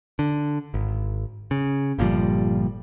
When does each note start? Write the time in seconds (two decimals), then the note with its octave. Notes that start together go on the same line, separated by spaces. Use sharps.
0.19 D3
0.74 G#1
1.51 C#3
1.99 G1 A#2 F3 G3